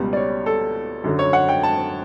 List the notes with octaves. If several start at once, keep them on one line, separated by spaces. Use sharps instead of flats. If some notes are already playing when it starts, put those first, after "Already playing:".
Already playing: C#2 B2 G3
D5
C#5
A4
F#2 D3 F#3
C#5
F#5
G5
A5